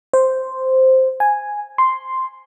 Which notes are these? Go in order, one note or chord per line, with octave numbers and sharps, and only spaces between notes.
C5
G#5
C6